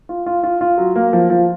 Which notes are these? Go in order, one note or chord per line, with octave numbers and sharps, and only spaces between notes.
F4
F4
F4
F4
F#3
A#3
F3
F3